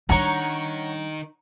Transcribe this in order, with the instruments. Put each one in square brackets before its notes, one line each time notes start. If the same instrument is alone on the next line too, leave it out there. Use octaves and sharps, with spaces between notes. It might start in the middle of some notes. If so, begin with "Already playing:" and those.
[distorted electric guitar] D#3 [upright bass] G3 D4 [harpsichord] C#5 F#5 [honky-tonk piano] A#5